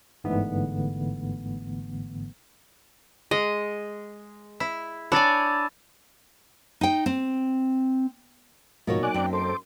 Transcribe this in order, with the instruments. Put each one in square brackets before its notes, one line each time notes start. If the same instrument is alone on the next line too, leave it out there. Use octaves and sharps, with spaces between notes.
[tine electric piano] G1 G#2 D3 E3 A3 B3
[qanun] G#3 [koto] D#5
[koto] E4
[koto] D4 G#5 [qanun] C#5 D5 [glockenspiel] B5 E6 A6
[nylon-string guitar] D#4 G5
C4
[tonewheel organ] G#2 F3 [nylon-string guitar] B2 F#4 C#5 [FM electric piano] F#3 A#3 D#4
[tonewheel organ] D5 D6 F#6 [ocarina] G#5
[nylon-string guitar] F#2 C4 [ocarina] G5
[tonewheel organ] A4 C5 D6 [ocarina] C6